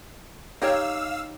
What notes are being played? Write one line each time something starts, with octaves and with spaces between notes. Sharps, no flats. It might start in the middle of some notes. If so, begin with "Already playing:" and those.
D#4 G4 C#5 F5 E6